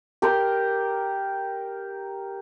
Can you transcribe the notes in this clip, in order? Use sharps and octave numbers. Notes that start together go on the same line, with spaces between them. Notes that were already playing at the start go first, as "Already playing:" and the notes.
G4 A#4 A#5 C6